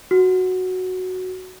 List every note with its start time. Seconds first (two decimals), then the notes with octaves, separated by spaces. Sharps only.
0.11 F#4